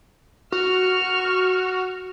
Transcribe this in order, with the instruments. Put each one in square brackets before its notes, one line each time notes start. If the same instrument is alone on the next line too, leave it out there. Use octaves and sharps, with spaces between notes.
[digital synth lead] F#4 [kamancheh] C#6 F6